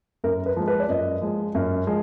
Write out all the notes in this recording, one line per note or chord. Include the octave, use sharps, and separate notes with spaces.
F#2 A#4
B4
F3 G#3
B4
D5
F#2 D#5
F3 G#3
F#2
F3 G#3